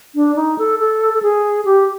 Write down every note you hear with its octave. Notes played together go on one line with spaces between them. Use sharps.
D4
D#4
A4
A4
A4
G#4
G4